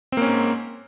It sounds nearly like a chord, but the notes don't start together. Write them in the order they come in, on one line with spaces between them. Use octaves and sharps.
C4 A#3 C#4 G#2